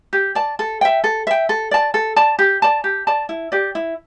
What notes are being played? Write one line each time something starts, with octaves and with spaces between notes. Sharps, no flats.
G4
D5 A5
A4
E5 G5
A4
E5 G5
A4
D5 A5
A4
D5 A5
G4
D5 A5
G4
D5 A5
E4
G4 D5
E4